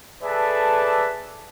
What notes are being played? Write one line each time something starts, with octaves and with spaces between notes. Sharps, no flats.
G#4 A4 B4 D5 E5 A5